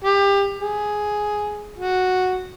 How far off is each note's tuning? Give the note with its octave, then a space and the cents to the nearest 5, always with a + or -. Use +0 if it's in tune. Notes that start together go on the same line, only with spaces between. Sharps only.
G4 +25
G#4 +5
F#4 -5